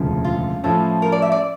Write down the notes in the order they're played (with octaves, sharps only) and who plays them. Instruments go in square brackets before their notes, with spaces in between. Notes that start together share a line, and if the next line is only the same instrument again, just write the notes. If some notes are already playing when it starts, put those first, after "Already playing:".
Already playing: [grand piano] E1 D2 C#3 F3
[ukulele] F4
[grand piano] A2 F3 C#4 F4 [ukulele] A4
[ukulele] A#4
D5
E5
D5